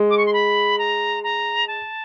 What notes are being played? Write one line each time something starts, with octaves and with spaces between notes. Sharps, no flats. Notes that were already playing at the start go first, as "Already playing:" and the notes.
Already playing: G#3
D6
C#6
C6
B5
A#5
A#5
A5